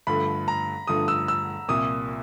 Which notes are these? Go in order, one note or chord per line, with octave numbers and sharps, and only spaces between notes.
G2 D3 F3 A3 B5
A#5
G2 D3 F3 A3 D#6
E6
E6
C2 A#2 F3 D#6